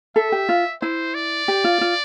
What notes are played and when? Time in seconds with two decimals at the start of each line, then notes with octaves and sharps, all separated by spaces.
0.16 A4 E5
0.32 G4
0.49 F4
0.82 E4 C5
1.14 D5
1.48 G4
1.64 F4
1.81 F4